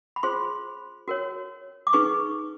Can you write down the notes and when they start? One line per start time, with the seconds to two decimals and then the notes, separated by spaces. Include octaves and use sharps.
0.16 B5
0.23 F4 G#4 C5 C6
1.08 F#4 A#4 C#5
1.87 D6
1.93 D#4 G#4 B4 C#6